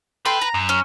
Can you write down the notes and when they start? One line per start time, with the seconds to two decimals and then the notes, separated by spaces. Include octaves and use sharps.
0.25 A4 B4 G5 C6
0.42 A#5
0.54 F#2
0.69 C#4